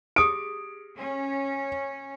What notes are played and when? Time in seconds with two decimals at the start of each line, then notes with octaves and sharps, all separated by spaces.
0.16 G4 G#4 D#6 D7
0.97 C#4